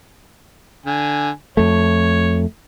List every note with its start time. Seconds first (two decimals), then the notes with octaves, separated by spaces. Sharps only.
0.86 D3 G#5
1.57 F2 A3 C#5